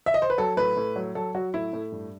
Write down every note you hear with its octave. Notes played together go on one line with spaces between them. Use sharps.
E5
D#5
C5
B4
F#3 A4
A2 B4
A2
F#3
F#3 A4
F#3 F#4
A2 E4
A2
G2